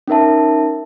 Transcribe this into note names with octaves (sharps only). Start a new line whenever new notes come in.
C#4 D#4 A#4 E5 A5